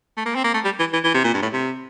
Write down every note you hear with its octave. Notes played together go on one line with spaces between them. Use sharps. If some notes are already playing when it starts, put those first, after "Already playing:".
A3
A#3
C4
A#3
A3
G3
E3
E3
E3
C3
A#2
G2
A2
C3